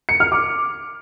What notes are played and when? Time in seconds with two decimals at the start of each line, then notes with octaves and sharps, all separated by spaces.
0.09 C#7
0.20 F6
0.32 D6